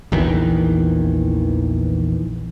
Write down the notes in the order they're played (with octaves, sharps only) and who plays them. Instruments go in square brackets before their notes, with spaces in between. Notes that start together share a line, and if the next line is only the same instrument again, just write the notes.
[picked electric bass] A#1 E2 D#3 E3